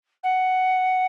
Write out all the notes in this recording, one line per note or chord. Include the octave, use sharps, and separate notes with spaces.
F#5